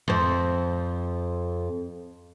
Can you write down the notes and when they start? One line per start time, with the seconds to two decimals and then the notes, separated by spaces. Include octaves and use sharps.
0.08 F2 C4